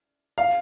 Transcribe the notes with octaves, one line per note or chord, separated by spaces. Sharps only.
F5